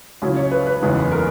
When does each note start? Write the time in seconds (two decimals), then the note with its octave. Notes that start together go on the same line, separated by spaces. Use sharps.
0.22 C#2 C#3 F#3 C#4 E4
0.36 C#5
0.51 B4
0.67 B4
0.82 F#1 E2 C#3 G#3 D#4
1.12 A#4